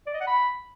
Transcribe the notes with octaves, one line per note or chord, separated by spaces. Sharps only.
D5
D#5
F#5
B5